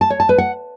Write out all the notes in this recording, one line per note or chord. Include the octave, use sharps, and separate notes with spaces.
A5
C#5
A5
B4
F#5